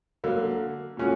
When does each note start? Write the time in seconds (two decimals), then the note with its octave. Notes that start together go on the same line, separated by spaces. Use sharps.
0.24 D3 F#3 A#3
0.97 A#2 F3 A3 C#4 F#4